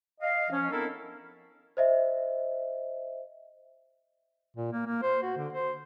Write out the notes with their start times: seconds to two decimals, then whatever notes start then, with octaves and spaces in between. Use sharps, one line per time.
0.21 D#5 F5
0.51 F3 C#4
0.71 B3 C4 D4 E4 A4 A#4
1.77 C5 D#5 E5
4.57 A#2
4.72 A#3
4.86 A#3
5.02 C5
5.22 F#4
5.37 D3
5.53 C5